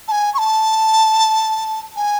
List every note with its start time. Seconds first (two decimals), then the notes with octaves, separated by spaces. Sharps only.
0.08 A5
0.12 G#5
0.34 C#6
0.38 A5
1.96 G#5